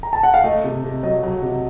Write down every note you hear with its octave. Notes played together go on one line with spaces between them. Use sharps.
A#5
A5
F#5
F5
A3 D#5
C3
C3
F#3 D#5
F#3
C3